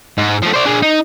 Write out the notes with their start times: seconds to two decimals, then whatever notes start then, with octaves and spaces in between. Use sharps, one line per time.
0.17 G#2
0.42 F3 A3
0.53 C5 D5
0.65 D4 G#4
0.82 D#4